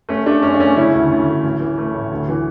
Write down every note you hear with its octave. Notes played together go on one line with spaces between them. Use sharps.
A3 C#4
A3 D4
F#2 C#4
D4
A3 C#4
C#3 C#4 E4
D2
D2
D2
A1
E3
A3
A2
D2
E3